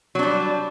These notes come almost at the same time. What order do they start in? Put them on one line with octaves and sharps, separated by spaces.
F#3 D4 G3